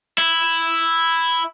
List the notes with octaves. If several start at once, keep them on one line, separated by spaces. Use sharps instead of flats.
E4